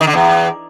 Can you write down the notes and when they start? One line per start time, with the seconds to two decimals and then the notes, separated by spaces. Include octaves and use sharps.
0.01 D#3
0.07 D3
0.14 E2